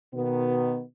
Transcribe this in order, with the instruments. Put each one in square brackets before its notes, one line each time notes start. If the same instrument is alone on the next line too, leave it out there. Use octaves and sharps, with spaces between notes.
[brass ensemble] B2 D#3 B3